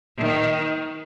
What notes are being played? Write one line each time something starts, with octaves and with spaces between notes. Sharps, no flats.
D#3